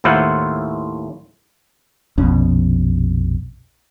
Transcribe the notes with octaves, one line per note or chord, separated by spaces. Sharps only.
D#2 A2 E4 F4 C5 F#5
A#1 F2 B2 C#4